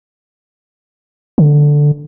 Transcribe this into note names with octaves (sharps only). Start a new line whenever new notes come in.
D3